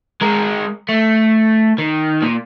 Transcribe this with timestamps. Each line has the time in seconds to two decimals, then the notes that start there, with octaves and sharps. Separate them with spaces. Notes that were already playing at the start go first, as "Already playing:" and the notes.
0.22 G#3 A#4
0.89 A3
1.78 D#3
2.22 A#2